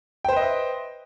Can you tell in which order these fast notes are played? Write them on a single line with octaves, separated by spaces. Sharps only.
G5 C5 B4 D#5 E5